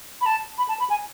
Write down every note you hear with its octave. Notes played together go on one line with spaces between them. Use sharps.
B5
A5
B5
A5
B5
G#5